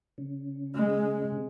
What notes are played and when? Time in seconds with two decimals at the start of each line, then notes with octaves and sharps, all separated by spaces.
0.18 C#3
0.75 G#3
1.31 C3